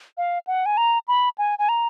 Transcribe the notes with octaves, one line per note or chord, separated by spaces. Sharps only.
F5
F#5
G#5
A#5
B5
G#5
G#5
A#5